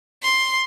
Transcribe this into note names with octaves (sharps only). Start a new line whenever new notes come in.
C6